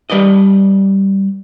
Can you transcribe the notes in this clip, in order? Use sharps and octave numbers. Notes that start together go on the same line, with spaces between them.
G3 B4 D5 D#5